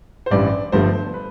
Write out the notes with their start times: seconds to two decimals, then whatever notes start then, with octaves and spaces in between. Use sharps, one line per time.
0.26 C5
0.31 A1 G2 E3 D5
0.72 G1 G2 F3 A3 C5
1.14 B4